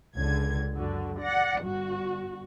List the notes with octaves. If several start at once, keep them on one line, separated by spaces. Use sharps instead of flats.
C#2 D3 G#6
F#2 D3 F#4
D5 F#5 A#6
G1 G2 F#4